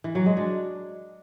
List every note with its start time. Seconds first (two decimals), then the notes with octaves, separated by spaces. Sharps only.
0.04 E3
0.15 F#3
0.26 G#3
0.37 D4